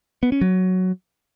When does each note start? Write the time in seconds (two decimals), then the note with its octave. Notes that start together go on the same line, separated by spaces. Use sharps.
0.23 B3
0.32 C#4
0.41 F#3